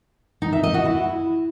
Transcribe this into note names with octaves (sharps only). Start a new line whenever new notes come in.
D#4
E5
D#5
F#4
E4